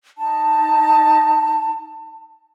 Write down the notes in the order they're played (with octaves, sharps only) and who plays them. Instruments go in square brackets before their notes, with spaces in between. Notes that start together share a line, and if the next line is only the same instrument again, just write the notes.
[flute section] D#4 A5